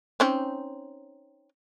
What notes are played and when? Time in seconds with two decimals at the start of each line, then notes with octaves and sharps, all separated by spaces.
0.20 C4 C#4 D#4